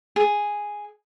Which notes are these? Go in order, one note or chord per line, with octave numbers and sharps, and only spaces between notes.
G#4